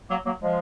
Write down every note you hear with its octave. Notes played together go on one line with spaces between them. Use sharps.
F#3 A#3
F#3 A#3
F3 G#3